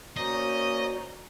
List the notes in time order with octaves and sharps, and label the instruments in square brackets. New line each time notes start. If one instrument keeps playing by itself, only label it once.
[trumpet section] A#3 C#4 [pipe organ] F#4 C5 D5 [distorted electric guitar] D#5 [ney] A#5